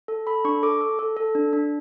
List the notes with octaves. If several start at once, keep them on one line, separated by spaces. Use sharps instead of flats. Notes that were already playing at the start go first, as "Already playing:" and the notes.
A4
A4 B5
D4 C#6
A4 D6
A4
A4
A4
D4
D4